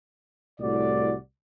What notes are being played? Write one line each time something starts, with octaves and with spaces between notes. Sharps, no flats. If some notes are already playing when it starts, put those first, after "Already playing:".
C2 A2 F#4 D5